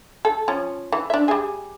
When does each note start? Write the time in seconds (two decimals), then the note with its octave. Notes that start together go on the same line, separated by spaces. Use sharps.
0.25 A4
0.48 F3 C#4
0.92 E3
1.10 D4 E5
1.28 G3 G#4